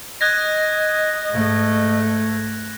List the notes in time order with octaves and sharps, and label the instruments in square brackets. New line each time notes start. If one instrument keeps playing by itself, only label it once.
[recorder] D#5 [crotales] F#6 G#6 A#6
[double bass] G#2 A3